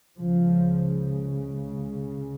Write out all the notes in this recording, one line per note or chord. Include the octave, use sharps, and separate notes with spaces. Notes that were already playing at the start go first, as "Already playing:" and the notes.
C#2 C#3 F3